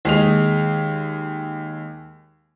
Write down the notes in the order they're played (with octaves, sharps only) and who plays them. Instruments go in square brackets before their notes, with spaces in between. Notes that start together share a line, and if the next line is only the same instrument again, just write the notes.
[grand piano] D#2 G#3 F7